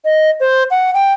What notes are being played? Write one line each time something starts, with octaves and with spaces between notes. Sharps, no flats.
D#5
C5
F#5
G5